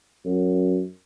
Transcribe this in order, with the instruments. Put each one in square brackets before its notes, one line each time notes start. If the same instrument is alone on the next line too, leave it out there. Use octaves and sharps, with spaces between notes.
[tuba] F#2